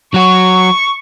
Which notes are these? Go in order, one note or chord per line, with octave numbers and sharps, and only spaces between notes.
F#3 F#4 C#6